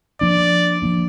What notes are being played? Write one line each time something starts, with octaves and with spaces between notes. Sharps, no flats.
F3 A#3 D4 D5
F3 A#3 D4